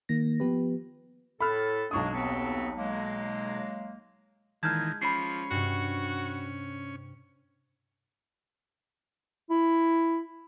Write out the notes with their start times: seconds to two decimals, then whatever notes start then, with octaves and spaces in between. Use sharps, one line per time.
0.09 D#3 A#3 A#6
0.40 F3 B3 G4 B4
1.40 A2 A4 B5 F6 F#6
1.91 B1 G#3 A#3 D4 C#6 D#6
2.14 D#2 B3 C4
2.77 F#3 G#3 A#3
4.63 A#2 D#3 E3 G#3 A5 F6 G6 G#6
5.02 F3 C#4 B5 C7
5.51 G2 C3 F#4
9.50 E4